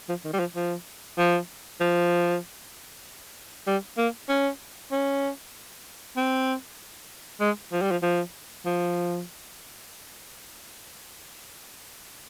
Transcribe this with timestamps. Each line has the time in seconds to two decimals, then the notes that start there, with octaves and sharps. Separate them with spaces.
0.09 F3
0.25 D#3
0.34 G3
0.40 F3
0.56 F3
1.18 F3
1.80 F3
3.67 G3
3.98 A#3
4.29 C#4
4.92 C#4
6.17 C4
7.41 G#3
7.72 F3
7.82 G3
7.91 F3
8.03 F3
8.65 F3